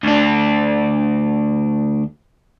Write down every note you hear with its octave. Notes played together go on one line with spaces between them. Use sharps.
D2 D4